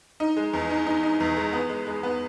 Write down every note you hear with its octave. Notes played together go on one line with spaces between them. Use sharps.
D#4
G#3
E2
D#4
D#4
D#4
E2
G#3
B3
G#3
G#3
B3